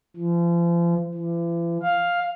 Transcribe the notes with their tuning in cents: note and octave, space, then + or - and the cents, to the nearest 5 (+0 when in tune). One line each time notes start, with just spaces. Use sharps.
F3 -40
E3 +45
F5 +5